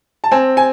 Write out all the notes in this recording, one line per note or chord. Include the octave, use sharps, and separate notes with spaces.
A5
C4 G#5
G#5